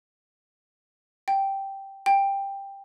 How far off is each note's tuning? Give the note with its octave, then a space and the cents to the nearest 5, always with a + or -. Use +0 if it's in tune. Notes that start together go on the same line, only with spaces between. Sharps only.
G5 -5
G5 +10